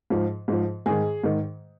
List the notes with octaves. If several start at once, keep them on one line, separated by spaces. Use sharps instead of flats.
G#2 F3
G#2 F3
G#2 D#3 G#4
G#2 D#3